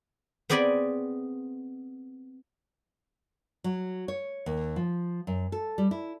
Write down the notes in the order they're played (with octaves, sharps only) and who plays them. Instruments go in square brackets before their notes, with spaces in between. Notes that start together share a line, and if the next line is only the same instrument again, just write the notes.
[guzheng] B3 C4 G#4 D5 G#5 B5
[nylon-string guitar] F#3
C#5
D#2
F3
F#2
A4
G3
E4